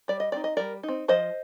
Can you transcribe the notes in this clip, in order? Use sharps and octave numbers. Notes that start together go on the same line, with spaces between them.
G3 D5
D#5
C4 D#4 D5
D#5
G3 A#4 D5
D#4
C4
F3 C5 D#5